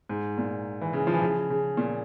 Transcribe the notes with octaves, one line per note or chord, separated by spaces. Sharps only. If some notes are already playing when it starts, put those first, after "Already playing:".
G#2
A#2
E3
C#3
F3
E3
C#3
C#3
A#2